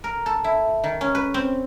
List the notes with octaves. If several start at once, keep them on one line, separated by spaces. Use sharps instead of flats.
A#4
A4
E4
D#3
C#4
B4
C4